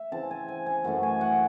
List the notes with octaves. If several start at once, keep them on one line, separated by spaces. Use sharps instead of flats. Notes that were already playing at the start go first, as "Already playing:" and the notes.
Already playing: E5
C#3 E3 C4 A5
G#5
G#5
G#5
F#2 E3 A3 C#4 F#5
G#5
F#5